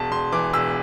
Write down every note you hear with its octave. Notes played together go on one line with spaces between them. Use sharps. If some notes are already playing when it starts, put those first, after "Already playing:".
Already playing: E1 A5
E1 C6
E3 D6
E1 E6